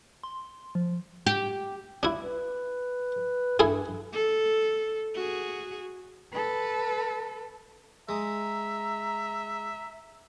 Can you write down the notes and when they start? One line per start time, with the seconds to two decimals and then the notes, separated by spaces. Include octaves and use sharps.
0.23 C6
0.75 F3
1.26 G4
2.03 D4 E4
2.21 B4
3.59 G2 E4 G#4 A4
4.13 A4
5.15 F#4 G#4
6.33 A4 B4
8.09 G#3 E5 A#5 D#6